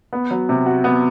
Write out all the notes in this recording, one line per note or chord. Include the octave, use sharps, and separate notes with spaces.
B3
F#3
C3
F#4
B3